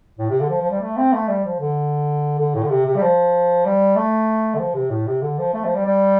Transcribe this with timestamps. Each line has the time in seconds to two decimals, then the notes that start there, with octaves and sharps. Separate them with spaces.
0.18 A2
0.30 C3
0.40 D3
0.50 F3
0.61 F3
0.71 G3
0.81 A3
0.97 C4
1.13 A3
1.28 G3
1.45 F3
1.60 D3
2.39 D3
2.55 A2
2.63 D3
2.70 C3
2.86 C3
2.96 G3
3.02 F3
3.65 G3
3.96 A3
4.55 D3
4.59 F3
4.74 C3
4.90 A2
5.07 C3
5.22 D3
5.39 F3
5.54 A3
5.64 F3
5.75 G3
5.86 G3